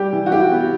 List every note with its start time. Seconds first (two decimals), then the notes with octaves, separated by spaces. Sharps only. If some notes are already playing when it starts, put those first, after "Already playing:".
Already playing: G3 G4
0.12 E3
0.26 F#4
0.32 G2 G4
0.52 B3